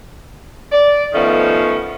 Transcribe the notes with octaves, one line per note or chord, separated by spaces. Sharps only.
D5
D#3 F3 A3 B3 C#4